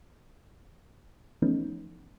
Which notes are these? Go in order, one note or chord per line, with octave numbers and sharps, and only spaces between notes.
E3 F3 A3 B3 C#4 D#4